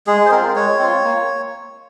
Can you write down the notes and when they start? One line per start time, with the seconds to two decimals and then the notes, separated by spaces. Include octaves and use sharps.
0.07 G#3 G#4
0.25 C5
0.31 C4 F4 A#4
0.56 G#3 C#5
0.79 C4 F4
1.03 A#3